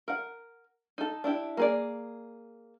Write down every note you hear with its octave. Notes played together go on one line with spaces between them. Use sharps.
A#4 F#5
D#4 A4
D4 E4 G4
A#3 G#4 D5